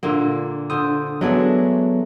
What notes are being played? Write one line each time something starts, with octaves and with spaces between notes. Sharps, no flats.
A#2 D3 A#3
D3 C5 D#6
F#3 G#3 A3 B3 D4